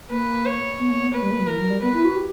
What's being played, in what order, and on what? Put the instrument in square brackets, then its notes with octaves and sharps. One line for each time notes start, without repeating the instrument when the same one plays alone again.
[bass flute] A#3 [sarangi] B4
[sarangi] C#5
[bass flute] B3
A#3
B3
[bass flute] A#3 [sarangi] B4
[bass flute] G3
A#3
F#3
[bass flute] E3 [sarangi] A#4
[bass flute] F#3
G3
[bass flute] B3 [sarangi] B4
[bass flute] E4
F#4
G4